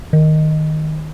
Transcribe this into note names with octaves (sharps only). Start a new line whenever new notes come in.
D#3